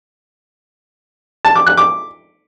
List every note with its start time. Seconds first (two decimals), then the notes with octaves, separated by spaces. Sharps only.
1.45 A5
1.56 D6
1.67 F#6
1.77 D6